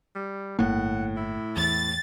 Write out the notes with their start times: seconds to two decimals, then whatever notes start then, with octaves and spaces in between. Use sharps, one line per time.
0.16 G3
0.59 G1 A2 A#3 F#5
1.17 E4
1.57 E2 A6